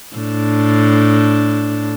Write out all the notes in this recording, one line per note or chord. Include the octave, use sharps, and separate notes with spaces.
A2 D4